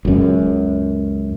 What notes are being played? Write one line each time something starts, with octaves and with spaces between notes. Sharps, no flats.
C#2 F#2